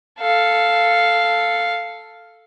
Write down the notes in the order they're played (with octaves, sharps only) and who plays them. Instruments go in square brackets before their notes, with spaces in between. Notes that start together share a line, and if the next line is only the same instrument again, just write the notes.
[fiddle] A4 F5